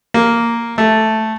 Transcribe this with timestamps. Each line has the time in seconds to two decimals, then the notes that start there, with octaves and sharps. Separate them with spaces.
0.14 A#3
0.78 A3